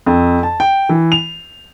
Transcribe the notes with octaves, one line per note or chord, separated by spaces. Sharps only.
F2
A5
G5
E3
F7